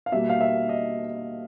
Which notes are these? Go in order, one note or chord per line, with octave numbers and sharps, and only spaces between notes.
F5
B2 G3 A#3 E5
F5
E5
D#5